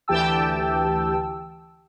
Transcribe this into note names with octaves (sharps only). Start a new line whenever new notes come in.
D2 E3 G4 G5 A5 E6